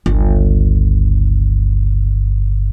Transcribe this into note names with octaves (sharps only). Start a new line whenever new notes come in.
G1 C#2